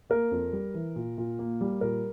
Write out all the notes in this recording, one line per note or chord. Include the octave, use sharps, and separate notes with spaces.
A#3 A#4
F2
G3
E3
A#2
A#2
A#3
G3
A#2 A#4